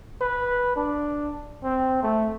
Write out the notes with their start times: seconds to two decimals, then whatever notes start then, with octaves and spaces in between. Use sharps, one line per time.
0.21 B4
0.76 D4
1.63 C4
2.03 A3